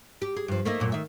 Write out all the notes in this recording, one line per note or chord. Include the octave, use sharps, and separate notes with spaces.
G4
G#4
G2 F3
A3 A#3 D#4
F#2 A#2
D#3 E5